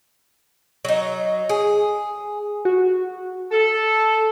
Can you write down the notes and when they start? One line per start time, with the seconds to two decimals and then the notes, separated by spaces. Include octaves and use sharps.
0.85 F#3 D#4
1.49 G#4
2.65 F#4
3.52 A4